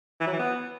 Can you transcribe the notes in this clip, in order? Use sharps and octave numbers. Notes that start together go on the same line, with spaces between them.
E3
F#3
E3
B3